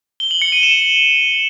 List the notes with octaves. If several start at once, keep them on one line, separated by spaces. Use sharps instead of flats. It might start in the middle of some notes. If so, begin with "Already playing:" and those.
G7
F#7
C#7
D#7
E7